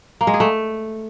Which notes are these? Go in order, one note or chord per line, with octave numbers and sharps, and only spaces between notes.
A#3
G#3
G#4
A3